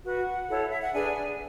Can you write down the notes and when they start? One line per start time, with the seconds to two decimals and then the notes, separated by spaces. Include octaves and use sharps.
0.05 F#4 B4 F#5
0.49 E4 A4 C#5
0.68 E5
0.81 F#5
0.93 D4 G#4 B4 G#5